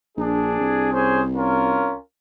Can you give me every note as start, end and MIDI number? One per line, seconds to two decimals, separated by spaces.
0.17 0.59 34
0.17 0.88 62
0.17 0.88 68
0.60 1.95 36
0.92 1.20 61
0.92 1.20 68
0.92 1.20 72
1.35 1.95 61
1.35 1.95 65
1.35 1.95 70